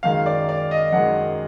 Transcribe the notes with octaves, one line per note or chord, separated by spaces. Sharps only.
F#2 D#3 G#3 F5
D5
D5
D#5
F#2 D#3 G#3 F#5